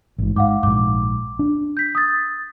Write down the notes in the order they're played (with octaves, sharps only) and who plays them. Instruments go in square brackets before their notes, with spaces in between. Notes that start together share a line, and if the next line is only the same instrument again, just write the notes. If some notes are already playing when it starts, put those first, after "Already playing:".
[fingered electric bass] A1 G#2
[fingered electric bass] G#2 [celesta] F5 F#5 D6
[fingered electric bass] A#1 G#2 [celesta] D6
[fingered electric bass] D4
[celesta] G6 B6
D#6 E6 A6